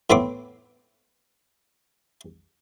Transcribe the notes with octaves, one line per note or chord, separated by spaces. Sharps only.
A2 B3 C4 D6